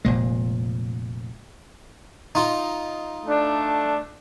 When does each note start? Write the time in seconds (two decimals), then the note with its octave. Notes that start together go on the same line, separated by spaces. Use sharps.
0.05 F1 A#2 G#3
2.35 D#4 F4
3.26 A3 D4